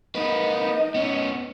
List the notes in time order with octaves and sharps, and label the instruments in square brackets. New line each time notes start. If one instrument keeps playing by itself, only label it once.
[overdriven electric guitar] A#3 B4 [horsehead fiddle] D#4 D#5
[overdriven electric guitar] B3 C#4